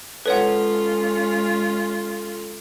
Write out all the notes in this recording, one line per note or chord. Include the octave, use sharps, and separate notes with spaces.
G#3 C#4 F4 A4 B4 C#5 F#5